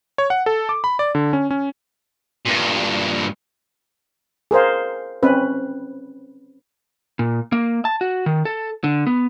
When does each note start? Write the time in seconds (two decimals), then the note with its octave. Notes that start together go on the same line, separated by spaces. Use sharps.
0.18 C#5
0.30 F#5
0.46 A4
0.69 D6
0.84 B5
0.99 D5
1.15 D3
1.33 C#4
1.51 C#4
2.45 G2 A#2
4.51 G#4 A#4 C5 F5
5.23 C4 C#4 B4
7.19 A#2
7.52 A#3
7.85 A5
8.01 F#4
8.26 D#3
8.45 A4
8.84 D3
9.07 B3